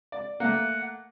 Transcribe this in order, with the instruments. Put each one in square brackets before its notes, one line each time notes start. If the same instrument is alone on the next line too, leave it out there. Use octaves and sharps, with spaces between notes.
[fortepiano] D5
[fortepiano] A3 A#3 [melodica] F#5